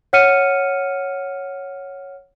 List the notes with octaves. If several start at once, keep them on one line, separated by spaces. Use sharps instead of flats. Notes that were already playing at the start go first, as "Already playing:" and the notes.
C#5 F#5 F6 C#7 D#7